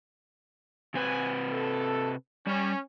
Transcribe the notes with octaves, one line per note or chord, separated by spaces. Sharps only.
C3 C4 B4 G#5
A4
G3 C#4